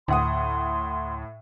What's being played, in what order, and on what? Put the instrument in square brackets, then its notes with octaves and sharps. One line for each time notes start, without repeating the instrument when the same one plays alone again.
[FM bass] D2 [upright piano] A2 F#5 D#6 [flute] C6